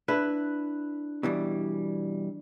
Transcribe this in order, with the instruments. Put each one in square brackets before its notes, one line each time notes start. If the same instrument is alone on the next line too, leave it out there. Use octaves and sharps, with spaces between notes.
[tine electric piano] D4 F#6 [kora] E4 B4
[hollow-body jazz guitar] B2 E3 G3